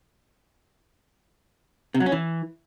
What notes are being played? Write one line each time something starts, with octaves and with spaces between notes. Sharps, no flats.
C3
F#3
C#4
E3